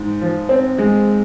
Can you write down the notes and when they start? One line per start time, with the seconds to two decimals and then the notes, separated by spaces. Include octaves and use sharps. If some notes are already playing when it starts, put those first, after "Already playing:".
Already playing: G#2
0.21 F3
0.49 C4
0.78 G#3